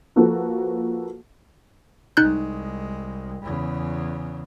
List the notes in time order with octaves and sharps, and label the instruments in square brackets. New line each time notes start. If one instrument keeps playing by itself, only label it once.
[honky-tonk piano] F3 A#3 F#4 A4 B4
[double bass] C2 G#3 [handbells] D#4 F#6 G6
[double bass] E2 C#3